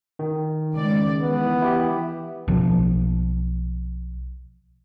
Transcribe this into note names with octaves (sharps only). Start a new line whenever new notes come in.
D#3
C#2 D5
E3 B3
E4 G4
B1 F3